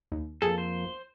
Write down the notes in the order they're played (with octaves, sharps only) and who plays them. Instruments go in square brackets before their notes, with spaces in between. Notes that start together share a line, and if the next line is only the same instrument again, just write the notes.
[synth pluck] D#2
[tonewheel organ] F2 F3 A#3 [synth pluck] G#4 [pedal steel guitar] A4
[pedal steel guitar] C5